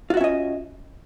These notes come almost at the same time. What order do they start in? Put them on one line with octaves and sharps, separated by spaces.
F4 F#4 E5 C#4 D#5